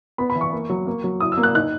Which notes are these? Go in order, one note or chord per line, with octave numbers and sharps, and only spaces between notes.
B3 B5
B5
E3
C#6
A#3
F#3
A#3
F#3
E4 D#6
E6
A#3
F#6
D#4 F#6